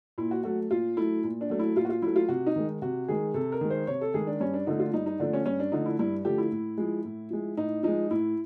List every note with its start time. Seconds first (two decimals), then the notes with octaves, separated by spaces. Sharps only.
0.18 A#2 E4
0.31 F#4
0.44 F#3 A3 F#4
0.71 A#2 F4
0.97 F#3 A3 E4
1.24 A#2
1.41 D4
1.50 F#3 A3
1.59 E4
1.76 A#2 F4
1.85 F#4
1.90 F4
2.02 F#3 A3 E4
2.16 F4
2.29 C3 F#4
2.47 D#4
2.56 D#3 G#3
2.82 C3 F#4
3.08 D#3 G#3 G#4
3.34 C3 A4
3.52 A#4
3.61 D#3 G#3
3.70 C5
3.87 C3 C#5
4.01 A4
4.14 D#3 G#3 G#4
4.27 D4
4.40 G2 C#4
4.54 D4
4.67 D3 F3 A3 D#4
4.79 F4
4.93 G2 D#4
5.06 D#4
5.20 D3 F3 A3 D4
5.33 C#4
5.46 G2 C#4
5.59 D4
5.72 D3 F3 A3 D#4
5.86 E4
5.99 G2 E4
6.25 D3 F3 A3 G4
6.38 E4
6.51 A2
6.77 F3 G#3
7.05 A2
7.30 F3 G#3
7.57 A2 D#4
7.83 F3 G#3 D#4
8.11 A2 E4